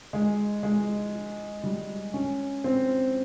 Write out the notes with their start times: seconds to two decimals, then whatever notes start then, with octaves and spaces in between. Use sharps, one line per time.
0.13 G#3
0.63 G#3
1.64 G3
2.14 C#4
2.64 C4